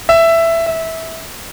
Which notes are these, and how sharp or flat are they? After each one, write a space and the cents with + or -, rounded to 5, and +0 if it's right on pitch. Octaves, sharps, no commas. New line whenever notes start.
E5 +10
E5 -20